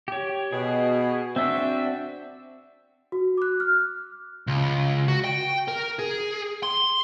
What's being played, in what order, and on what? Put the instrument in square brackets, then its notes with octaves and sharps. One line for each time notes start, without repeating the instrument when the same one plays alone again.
[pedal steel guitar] G4 C#5
[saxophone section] B2 [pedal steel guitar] G#4
[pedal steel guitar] C4 D4 F#4 [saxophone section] E5
[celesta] F#4
D6 F#6
F6
[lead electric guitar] C#2
F#4
G5
A#4
G#4
C6